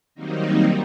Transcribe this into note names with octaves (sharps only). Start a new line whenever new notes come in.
D#3 F#3 G3 A#3 C4 D#4